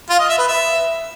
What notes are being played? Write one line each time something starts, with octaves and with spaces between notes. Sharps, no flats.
F4
D#5
E5
B4
E5